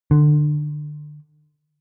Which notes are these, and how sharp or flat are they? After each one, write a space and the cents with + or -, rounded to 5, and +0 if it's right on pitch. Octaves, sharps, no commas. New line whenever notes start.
D3 +25